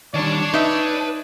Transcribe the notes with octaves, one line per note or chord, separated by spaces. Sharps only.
D#3 G3 C#5 D5 A5
D#4 B4 E5